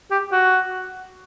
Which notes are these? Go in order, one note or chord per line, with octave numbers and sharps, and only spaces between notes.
G4
F#4